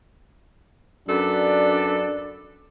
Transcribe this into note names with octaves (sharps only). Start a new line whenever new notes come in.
F#2 D4 F#4 A4 B4 D5